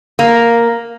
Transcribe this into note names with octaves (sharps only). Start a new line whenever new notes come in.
A#3